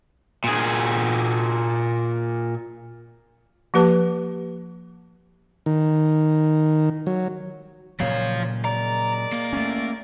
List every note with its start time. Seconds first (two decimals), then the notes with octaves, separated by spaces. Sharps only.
0.44 A#2 G#4
3.74 F3 A#3 G4 B4 A5
5.66 D#3
7.07 F#3
8.00 A#2 C#3 F3 F#3 C#5 F5
8.65 G#3 A#4 D5 A#5
9.32 A#3
9.53 A3 C#4